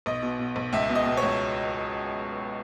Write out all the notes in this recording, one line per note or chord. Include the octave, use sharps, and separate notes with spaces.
B1 D#5
B2
B2
B1
C#2 E5
B2
D#5
B2
C#2 C#5